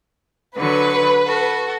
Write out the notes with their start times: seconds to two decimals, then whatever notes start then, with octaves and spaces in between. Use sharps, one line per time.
0.57 D3 F#3 B4 C#6
1.27 F#4 A4